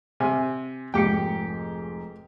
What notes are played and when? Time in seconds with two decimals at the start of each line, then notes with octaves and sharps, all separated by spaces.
0.20 C3 G#5
0.94 F1 G#2 G4 G5 C#7